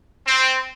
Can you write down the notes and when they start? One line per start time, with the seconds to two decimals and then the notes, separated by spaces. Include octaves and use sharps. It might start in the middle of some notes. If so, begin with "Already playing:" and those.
0.27 C4